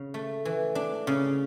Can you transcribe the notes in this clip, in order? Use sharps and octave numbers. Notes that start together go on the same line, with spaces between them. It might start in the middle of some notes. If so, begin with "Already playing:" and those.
Already playing: C#3
A3
E3
D4
C#3